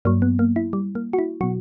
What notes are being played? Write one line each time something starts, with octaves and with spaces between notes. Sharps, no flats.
G2 F#3 A#3
B3
A#3
E4
G3
A#3
F#4
E4
B2 F#3 F#4